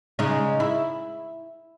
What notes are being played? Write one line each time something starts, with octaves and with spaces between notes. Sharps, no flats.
C#3 G#3 D#4
E4